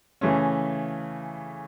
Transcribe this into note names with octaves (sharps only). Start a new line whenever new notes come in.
C#3 E3 A3 C#4